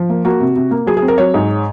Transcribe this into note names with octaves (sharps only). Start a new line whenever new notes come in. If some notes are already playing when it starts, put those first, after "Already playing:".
Already playing: F3
A#3
A#3 F#4
C3
C3
A#3
F#3 G#4
G#4
C4
A#4
F#3 C#5
G#2